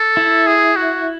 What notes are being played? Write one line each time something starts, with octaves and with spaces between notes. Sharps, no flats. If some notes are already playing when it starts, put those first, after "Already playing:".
Already playing: A4
E4
G#4
F#4